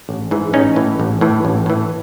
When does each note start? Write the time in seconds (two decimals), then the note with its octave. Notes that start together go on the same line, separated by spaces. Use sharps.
0.09 A1
0.31 G#2 E3
0.53 A1 C#4 D#4
0.76 A2 E3
1.00 A1
1.21 A2 E3
1.45 A1
1.66 A2 E3